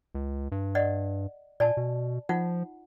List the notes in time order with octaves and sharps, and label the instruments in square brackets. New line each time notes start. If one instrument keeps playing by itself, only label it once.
[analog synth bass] C#2
G2
[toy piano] D5 D#5 F#5
[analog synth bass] A#2 [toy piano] D5 G#5 A5
[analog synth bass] B2
[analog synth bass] F3 [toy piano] D#4 F4 F#5